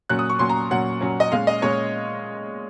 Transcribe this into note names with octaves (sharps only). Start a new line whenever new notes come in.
A#2 F#3 C#4 F#6
D#6
C#6
A#2 F#3 C#4 C6
A#5
A#2 F#3 C#4 F#5
A#2 F#3 C#4
D#5
A#2 G#3 C#4 F5
D#5
A#2 G#3 C#4 C#5